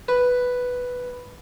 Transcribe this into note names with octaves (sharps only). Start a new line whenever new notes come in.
B4